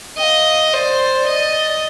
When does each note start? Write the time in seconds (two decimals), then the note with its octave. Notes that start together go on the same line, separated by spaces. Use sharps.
0.18 D#5 G5
0.23 F5
0.73 C5 D5
1.28 D#5